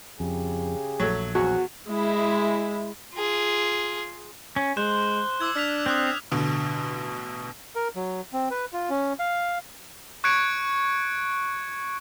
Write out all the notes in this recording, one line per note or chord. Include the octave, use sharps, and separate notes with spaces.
F2 C#3 G4 G#4
A#1 F#3 A3
E2 F#3 C4 F#4 G#4
G#3 E4
F4 G#4
C#4
G#3 C5 F#6
E4 D6 E6 G#6
D4 F6 B6 F7
C4 D#6 F#6 F7
A1 B2 D3
A#4
F#3
C4
B4
F4
C#4
F5
C#6 F#6 G#6 C#7 D7